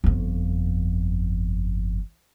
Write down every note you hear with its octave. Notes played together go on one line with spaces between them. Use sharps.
G1 F2